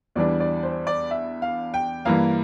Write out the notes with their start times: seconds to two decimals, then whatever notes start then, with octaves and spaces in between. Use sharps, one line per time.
0.15 E2 E3 G3 D4 D5
0.40 D5
0.63 C5
0.87 D5
1.11 E5
1.42 F5
1.74 G5
2.05 G2 E3 A#3 F5